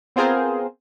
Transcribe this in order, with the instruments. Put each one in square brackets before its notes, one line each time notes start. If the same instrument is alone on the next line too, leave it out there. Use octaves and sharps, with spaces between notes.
[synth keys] B3 C4 F4 G#4 A#4 C5